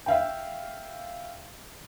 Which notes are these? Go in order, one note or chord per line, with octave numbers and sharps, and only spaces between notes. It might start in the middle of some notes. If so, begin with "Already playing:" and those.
E5 F5 G5